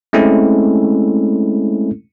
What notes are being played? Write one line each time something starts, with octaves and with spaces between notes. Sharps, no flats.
G#3 A3 C4 C#4 E4 A4